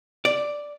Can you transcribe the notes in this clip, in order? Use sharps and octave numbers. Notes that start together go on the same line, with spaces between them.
D5